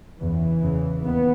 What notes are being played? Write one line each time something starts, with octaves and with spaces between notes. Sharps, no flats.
E2 C#3 E3
E2 C#3
D#2 B3